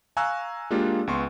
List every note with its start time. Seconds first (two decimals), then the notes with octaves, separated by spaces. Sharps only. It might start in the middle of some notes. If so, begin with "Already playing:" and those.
0.17 F5 G#5 A#5 C#6 E6 F#6
0.70 G#3 A#3 D4 F4 G4
1.07 C#2 B3 C6 C#6